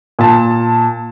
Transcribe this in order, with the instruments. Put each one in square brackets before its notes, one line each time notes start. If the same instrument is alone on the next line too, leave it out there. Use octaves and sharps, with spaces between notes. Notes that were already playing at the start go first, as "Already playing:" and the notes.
[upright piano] A#2 A5